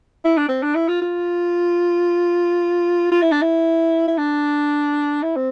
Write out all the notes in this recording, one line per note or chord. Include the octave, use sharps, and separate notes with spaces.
E4
D4
C4
D4
E4
F4
F4
F4
E4
D4
E4
E4
D4
E4
C4